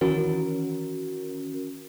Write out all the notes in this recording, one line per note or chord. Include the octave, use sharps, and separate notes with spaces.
D#3 E3 C#4 F#4 A#4